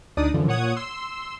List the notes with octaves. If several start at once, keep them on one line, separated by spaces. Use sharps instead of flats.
D2 D4 D#4 D5 D#6
F#2 D3 E3 F3
A#2 C#5 F#5 D#6 G#6
C6 E6